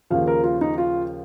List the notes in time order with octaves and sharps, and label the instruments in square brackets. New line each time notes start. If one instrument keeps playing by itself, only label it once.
[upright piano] D#2 C#3 F3 F5
A#4
F4
D#4
F4